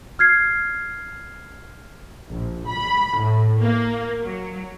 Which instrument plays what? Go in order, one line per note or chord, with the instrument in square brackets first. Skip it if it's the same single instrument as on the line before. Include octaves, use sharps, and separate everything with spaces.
[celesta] F6 G#6 C7
[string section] A#1
B5
A2
A#3
F#3